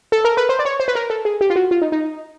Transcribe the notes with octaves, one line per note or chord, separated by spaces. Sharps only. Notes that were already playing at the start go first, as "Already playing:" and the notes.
A4
A#4
B4
C5
D5
C#5
C5
B4
A#4
A4
G#4
G4
F4
F#4
F4
D#4
D#4